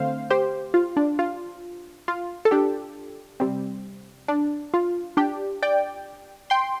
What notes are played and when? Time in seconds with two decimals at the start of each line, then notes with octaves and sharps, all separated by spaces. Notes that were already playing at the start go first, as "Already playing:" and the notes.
Already playing: D3 A3 C4 C5 F5
0.30 G4 C5
0.74 F4
0.97 D4
1.19 F4
2.08 F4
2.45 A4
2.51 D4 G4
3.40 C3 G3 C4
4.28 D4
4.74 F4
5.17 D4 G4
5.63 D5 G5
6.50 G5 C6